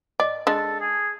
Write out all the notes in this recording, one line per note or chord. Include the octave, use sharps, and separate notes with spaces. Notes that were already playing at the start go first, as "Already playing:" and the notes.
D5 D#5
G#3 D4 A4 D#5
G#4